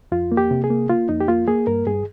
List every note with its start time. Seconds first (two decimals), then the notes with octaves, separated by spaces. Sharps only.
0.12 F2 F4
0.32 A#3
0.37 G4
0.51 C3
0.64 G#4
0.70 A#3
0.89 A#3 F4
1.09 F2 D#4
1.21 G4
1.28 A#3 F4
1.48 A#3 G#4
1.67 G2 A#4
1.87 G2 G#4